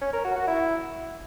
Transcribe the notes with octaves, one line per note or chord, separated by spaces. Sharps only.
C#4
A#4
F#4
F#4
E4